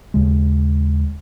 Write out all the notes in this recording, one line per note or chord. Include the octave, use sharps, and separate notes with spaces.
D#2 C#3 G#3